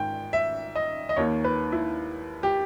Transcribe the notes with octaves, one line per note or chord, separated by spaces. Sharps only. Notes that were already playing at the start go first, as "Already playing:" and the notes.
Already playing: G#2 D#3 G5
E5
D#5
D#5
D#2 D#3 C#5
B4
E4
G4